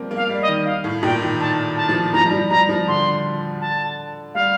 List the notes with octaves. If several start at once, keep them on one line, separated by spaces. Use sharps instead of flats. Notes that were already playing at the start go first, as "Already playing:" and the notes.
Already playing: F3 G3 A#3 C4
A#3
F5
G3
D#5
D#3
F5
A2
A#2 G5
D#3
D#3 A5
A5
F3
F3 A#5
G3
F3
G3 A#5
F3
D3 C6
A5
G3 F5